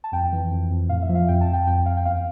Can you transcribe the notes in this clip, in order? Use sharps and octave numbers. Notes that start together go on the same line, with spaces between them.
A5
F2 G5
E3
F2
F2
A2 F5
E5
F3
F5
F2 G5
A5
F2
G5
F2 G5
F2 F5
G5
E2 F5